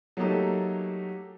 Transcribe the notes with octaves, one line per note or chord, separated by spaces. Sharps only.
F#3 A3 A#3 D#4 G4 A4